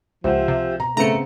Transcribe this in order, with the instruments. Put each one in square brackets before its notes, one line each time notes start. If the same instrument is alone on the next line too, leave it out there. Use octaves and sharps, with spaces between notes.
[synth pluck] C#2 [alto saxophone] F3 [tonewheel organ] G4 E5 [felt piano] C5 F#5
[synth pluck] C3
[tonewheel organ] B2 [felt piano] A#5
[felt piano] C#3 B3 C4 [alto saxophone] A3 [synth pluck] A#5 C#7